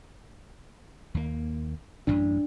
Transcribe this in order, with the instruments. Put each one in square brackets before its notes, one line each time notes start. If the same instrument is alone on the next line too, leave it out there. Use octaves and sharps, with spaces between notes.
[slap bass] D#2 A#3
[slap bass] D#1 A1 F#2 [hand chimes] D4